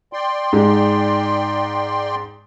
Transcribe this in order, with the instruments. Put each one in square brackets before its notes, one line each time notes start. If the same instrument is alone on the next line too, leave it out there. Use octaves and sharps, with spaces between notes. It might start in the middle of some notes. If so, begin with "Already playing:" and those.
[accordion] D5 G5 C6
[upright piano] G#2 G#3